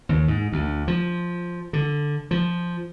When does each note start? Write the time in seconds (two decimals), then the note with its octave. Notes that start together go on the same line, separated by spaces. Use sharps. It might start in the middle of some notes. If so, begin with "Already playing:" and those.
0.09 D#2
0.28 G#2
0.52 D2
0.88 F3
1.73 D3
2.31 F3